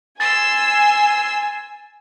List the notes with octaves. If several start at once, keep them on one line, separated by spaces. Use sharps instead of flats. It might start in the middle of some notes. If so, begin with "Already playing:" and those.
G#5 C6 E6 A6